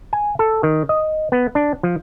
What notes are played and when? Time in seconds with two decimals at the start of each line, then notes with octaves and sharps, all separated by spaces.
0.13 G#5
0.39 A4
0.63 D#3
0.89 D#5
1.32 B3
1.55 D4
1.83 F3